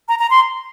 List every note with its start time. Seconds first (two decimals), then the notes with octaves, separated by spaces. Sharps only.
0.08 A#5
0.19 A#5
0.30 C6